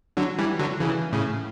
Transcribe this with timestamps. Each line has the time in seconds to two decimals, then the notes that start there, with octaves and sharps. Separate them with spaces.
0.17 D3 F#3
0.38 E3 G3
0.59 D3 F#3
0.80 C#3 E3
1.13 A2 C#3